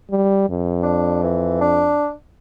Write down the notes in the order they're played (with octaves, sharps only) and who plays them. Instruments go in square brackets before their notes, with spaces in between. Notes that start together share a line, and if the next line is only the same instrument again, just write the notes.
[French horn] G3
F2
[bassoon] D4
E3
D4